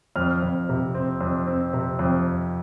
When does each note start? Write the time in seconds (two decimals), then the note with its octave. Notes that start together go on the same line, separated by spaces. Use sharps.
0.16 F2 F6
0.42 F2
0.69 C3
0.95 C4
1.21 F2
1.47 C4
1.73 C3
1.99 F2